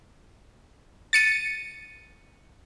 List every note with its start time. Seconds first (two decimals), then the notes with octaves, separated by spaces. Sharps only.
1.13 A6 C#7 D#7